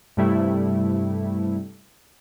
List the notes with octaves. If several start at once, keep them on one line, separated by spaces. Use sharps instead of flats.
G2 C3 G3 A3 E4